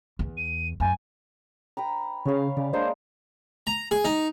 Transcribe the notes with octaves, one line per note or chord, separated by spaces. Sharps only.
E2
D#7
F#2 G#5
B4 G5 A#5
C#3 C#5 F5
C#3 D5
G#3 A#3 D4 C5
A#5
G#4
D#4